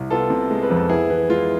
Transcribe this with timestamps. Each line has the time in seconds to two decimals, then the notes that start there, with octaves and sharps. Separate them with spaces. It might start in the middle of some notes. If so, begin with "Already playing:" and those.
Already playing: C2
0.11 B3 F4 A4
0.30 C3
0.51 G#3
0.63 B4
0.70 F2
0.77 A4
0.89 B3 E4 G#4
1.10 E3
1.29 G#3 F4